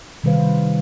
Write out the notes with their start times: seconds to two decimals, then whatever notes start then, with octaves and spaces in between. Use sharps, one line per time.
0.24 C3 D#3 G3 B4 C5 F5